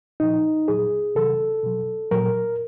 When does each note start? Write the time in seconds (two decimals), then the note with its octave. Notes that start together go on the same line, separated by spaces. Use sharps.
0.20 A#2 F3 D#4
0.68 A#2 F#3 G#4
1.15 C3 D#3 F#3 A4
1.63 B2 F#3
2.11 A#2 F#3 A#4